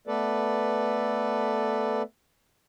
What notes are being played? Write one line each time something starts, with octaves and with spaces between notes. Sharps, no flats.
A3 B3 A4 B4 D5